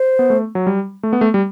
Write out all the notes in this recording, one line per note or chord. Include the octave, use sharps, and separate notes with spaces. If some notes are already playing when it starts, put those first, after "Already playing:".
Already playing: C5
B3
A3
F#3
G3
A3
B3
A3
G3